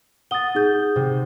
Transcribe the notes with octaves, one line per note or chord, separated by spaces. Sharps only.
F#5 D#6 A6 G7
D#4 G#4 G6
C3